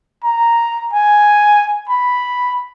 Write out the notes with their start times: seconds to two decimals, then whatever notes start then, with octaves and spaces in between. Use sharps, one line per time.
0.23 A#5
0.93 G#5
1.89 B5